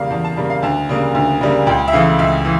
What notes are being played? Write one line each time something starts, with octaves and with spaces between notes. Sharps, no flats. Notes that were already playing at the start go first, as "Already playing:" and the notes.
Already playing: E2 C#3 G3 A#3 F5
E2 A5
A5
C#3 G3 A#3 A5
F5
D2 A5
C#3 G3 A#3
D2
C#3 G3 A#3
C#2 G5
E5
C#3 E3 A3 F5
C#2 E5
E3